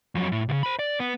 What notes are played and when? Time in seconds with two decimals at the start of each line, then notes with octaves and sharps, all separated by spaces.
0.15 F2 F#3
0.32 A2
0.49 C2 C#3
0.63 C5 B5
0.79 D5
1.00 B3